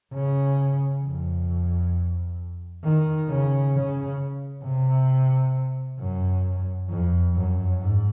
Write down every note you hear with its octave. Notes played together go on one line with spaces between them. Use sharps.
C#3
F2
D#3
C#3
C#3
C3
F#2
F2
F#2
G#2